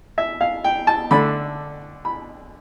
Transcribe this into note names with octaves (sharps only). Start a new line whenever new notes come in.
E5
F5
G5
A5
D3 A3 D4 B5
B5